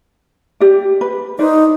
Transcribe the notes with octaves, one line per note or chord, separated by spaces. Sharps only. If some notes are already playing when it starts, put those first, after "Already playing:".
G4 D5
B4
D#4 B4 C5 D5